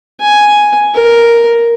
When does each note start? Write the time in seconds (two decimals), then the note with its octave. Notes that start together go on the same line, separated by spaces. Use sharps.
0.20 G#5
0.94 A#4